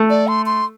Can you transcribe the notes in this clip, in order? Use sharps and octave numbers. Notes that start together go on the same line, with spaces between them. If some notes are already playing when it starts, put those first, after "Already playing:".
Already playing: A3
D5
C6
C6